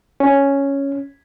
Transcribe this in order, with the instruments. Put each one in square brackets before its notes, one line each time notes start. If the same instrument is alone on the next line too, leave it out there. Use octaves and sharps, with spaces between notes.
[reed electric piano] C#4